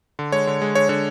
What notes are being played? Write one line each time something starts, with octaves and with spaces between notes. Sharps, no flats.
D3
G#3 C#5
D3
G#3
D3 C#5
D3 C#5